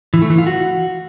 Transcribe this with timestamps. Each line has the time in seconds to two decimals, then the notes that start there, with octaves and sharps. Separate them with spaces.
0.14 E3
0.22 A3
0.30 E3
0.38 F4
0.47 F#4